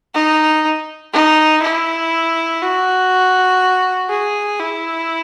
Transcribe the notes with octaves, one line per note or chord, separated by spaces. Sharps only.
D#4
D#4
E4
F#4
G#4
E4